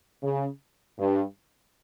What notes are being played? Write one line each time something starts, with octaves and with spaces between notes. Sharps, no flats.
C#3
G2